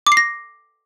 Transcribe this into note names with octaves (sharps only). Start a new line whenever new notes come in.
D6
C7
A#6